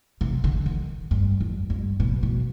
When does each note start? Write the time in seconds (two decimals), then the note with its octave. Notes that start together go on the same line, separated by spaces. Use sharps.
0.21 C3
0.44 D3
0.66 D#3
1.11 G2
1.41 F2
1.70 G2
2.00 B2
2.23 B2